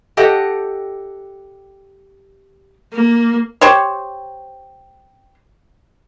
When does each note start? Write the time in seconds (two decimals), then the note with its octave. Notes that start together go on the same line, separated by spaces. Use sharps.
0.17 G4 A4 D#5 F#5 G5 A5
2.93 A#3
3.61 G4 C5 C#5